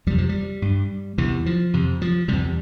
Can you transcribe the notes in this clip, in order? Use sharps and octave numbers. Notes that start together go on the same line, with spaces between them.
F2 C3 G3
F3
G3
G2
E2 C3 E3
F3
F2 C3
F3
E2 C3 G3